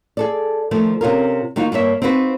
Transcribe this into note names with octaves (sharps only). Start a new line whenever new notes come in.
G#4 A4 D5
D#3 F3 A3
C3 C#4 F4 A#4
D#3 A#3 D#4 F4 F#4
G2 A#3 C#5 E5
C4 D#4 F4 F#4 B4